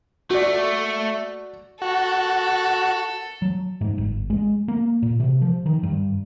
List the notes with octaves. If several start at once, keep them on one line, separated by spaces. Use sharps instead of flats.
A3 F#4 D5
F#4 A4
F#3
G#2
G1
G#3
A#3
A#2
C3
F3
D#3
G2